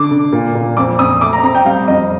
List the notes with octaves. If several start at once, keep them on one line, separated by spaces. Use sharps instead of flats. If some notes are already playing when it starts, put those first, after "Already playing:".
Already playing: D3 D6
D3
A#2
A#2
F2 D6
C4 D#6
A3 D6
A#5
C4 A#5
G5
G3 F5
F2 D#5